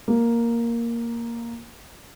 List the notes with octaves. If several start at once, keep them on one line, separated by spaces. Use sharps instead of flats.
A#3